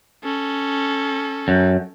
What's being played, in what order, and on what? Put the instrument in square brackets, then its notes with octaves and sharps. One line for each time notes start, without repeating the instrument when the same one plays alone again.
[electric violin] C#4 A4
[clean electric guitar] F#2